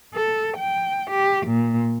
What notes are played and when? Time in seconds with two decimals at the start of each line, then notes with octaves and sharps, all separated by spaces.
0.14 A4
0.57 G5
1.11 G4
1.47 A#2